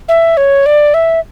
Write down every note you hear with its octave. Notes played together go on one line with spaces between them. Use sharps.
E5
C#5
D5
E5